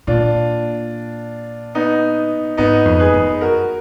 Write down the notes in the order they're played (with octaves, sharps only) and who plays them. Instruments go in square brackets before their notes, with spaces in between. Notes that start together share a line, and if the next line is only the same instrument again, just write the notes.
[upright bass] A#2 [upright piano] D4 F4
[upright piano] B3 D#4
[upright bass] G#2 [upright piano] B3 D#4
[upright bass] F2
[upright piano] G#4 B4
[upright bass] F#2
[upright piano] F#4 A#4